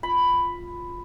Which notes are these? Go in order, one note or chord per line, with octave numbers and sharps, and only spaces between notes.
F4 B5